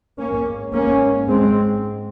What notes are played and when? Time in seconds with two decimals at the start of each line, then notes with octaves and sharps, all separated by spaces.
0.19 G#2 A#3 C#4
0.73 A#3 C#4
1.28 G#3 C4